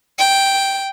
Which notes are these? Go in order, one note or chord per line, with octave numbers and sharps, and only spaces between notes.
G5